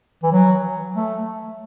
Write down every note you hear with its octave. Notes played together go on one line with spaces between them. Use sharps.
E3
F#3
A3